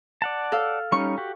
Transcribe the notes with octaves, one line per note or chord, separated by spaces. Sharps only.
D5 F#5 A5
A4 F5
G3 C#4 D#4 C#6
F#4 G4